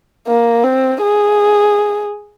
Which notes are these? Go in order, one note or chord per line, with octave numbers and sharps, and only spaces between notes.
A#3
C4
G#4